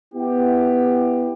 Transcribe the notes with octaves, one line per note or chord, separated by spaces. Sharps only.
B3 E4 G4